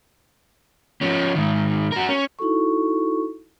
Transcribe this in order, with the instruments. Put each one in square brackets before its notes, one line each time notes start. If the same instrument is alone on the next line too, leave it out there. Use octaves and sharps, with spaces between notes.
[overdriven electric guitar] F3 C#4
G#2 D#3
F#4 A#4
C#4
[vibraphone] D#4 E4 F#4 A4 C#6